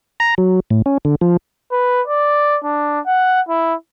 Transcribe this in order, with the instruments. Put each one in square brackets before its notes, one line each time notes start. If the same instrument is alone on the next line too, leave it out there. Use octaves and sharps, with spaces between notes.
[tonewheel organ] A#5
F#3
A2
C#4
D3
F3
[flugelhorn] B4
D5
D4
F#5
E4